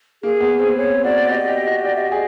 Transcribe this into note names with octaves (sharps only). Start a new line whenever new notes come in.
A#3 G#4
B3
C4
C#5
F#4 D5
G4 D#5
G4
F#4
G4 D5
E5
D#5
G#4